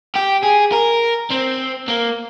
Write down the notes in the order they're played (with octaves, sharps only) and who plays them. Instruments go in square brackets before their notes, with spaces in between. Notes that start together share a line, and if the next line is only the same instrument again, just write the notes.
[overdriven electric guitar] G4
G#4
A#4
C4
A#3